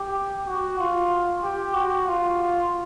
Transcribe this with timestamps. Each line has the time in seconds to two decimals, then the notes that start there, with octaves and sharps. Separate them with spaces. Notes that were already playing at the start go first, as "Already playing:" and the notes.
Already playing: G4
0.47 F#4
0.79 F4
1.43 G4
1.74 F#4
2.07 F4